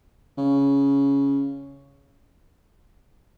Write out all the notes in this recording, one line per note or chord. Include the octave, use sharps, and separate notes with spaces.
C#3